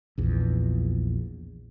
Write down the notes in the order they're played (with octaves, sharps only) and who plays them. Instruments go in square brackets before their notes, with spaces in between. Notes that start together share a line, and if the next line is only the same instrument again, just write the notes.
[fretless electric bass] A#1 E2